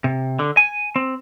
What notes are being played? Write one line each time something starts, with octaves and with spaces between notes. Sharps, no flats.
C3
D3
G#5
C4